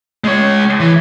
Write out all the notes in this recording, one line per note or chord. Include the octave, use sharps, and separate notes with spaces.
G#3 C#5
E3